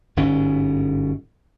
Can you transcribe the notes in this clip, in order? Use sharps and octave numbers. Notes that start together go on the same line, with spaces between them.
G1 G#2 B2 C#4